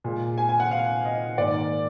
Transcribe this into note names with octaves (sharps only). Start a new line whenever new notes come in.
A#2 G#3
G#5
G#5
F#5
F5
D#5
G#2 D#3 A#3 D5